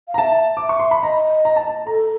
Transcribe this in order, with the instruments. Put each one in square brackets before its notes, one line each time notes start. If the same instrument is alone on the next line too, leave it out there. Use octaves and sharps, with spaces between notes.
[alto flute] F5
[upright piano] A#5
[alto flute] E5 [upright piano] A5
[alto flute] E5 [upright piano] D6
[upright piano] C#6
C6
B5
[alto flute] D#5 [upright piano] A#5
[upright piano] A#5
A5
A#5
[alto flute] A4 [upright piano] A#5